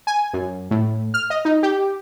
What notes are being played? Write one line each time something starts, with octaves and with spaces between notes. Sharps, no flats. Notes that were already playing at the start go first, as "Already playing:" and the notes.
G#5
F#2
A2
F6
D#5
D#4
G4